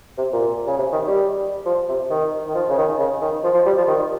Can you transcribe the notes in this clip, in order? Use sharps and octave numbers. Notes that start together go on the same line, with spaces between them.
C3
A#2
C#3
C3
D#3
G3
F3
C3
D#3
D#3
F3
C#3
D#3
C#3
D#3
F3
F3
G3
F3
D#3